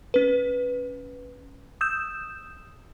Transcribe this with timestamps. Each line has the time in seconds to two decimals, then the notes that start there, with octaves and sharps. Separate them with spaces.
0.14 C#4 B4
1.81 D#6 E6 G6 E7